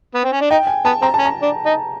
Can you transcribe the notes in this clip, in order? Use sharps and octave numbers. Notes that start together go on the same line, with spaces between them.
B3
C4
C#4
D4
D#4 G5
G#5
B3 A5
C4 A#5
A5
C#4
A#5
D4
D#4